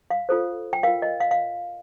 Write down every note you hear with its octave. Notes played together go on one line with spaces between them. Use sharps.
F5
F4 A4 C5
G5
F4 A#4 F5
D#5
F5
F5